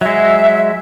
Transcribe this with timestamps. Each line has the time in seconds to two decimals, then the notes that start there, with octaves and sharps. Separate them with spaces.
0.01 F#3 G#3 E5